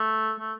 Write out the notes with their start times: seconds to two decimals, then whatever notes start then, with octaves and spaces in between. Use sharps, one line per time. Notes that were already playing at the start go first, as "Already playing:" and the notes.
Already playing: A3
0.40 A3